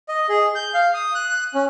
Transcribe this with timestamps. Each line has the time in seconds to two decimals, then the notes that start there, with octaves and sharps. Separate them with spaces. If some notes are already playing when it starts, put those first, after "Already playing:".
0.09 D#5
0.29 G#4
0.55 G6
0.74 F5
0.94 D#6
1.15 F#6
1.54 C#4